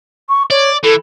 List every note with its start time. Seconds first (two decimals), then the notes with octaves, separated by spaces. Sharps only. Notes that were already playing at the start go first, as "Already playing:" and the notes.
0.29 C#6
0.50 C#5 D5
0.83 E3 A4